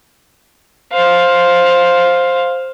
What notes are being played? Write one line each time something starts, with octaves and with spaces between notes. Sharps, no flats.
C5 F5